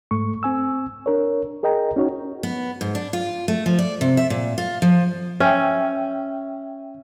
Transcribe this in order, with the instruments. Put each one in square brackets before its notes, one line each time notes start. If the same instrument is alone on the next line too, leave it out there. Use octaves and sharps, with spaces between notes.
[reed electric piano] G#2 A3 C#6
C4 G#5 E6
D4 A#4 C#5
G#4 A#4 D#5 G5 A#5
C#4 D#4 F#4 C#5
[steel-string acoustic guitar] B3
G#2
D4
F4
A3
F3
D5
C3
E5
A#2
F4
F3
[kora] C#4 [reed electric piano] E5 G5